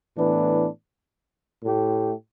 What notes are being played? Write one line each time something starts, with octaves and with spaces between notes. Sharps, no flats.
A2 E3 B3 D4 B4
A2 A3 G4